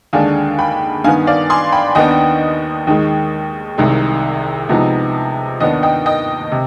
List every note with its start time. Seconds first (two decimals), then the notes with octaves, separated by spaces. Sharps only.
0.13 D#2 D3 G#3 D4 F5 G#5
0.59 G5 B5
1.04 G2 D#3 B3 F5 G#5
1.27 D5 F5
1.50 G#5 C6
1.72 G5 B5
1.95 D#2 D#3 B3 D4 D#5 G5
2.87 D#2 D#3 G#3
3.78 C2 C3 D#3 G#3
4.69 C3 F3 G#3 B3 D#4
5.60 D#2 D#3 B3 D4 D#5
5.83 D#5 G5
6.06 D#5 G5
6.51 C3